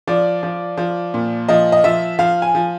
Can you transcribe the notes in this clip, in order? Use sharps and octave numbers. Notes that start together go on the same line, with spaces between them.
F3 D5
F3
F3
A#2
F3 D#5
D#5
F3 E5
F3 F5
G#5
F3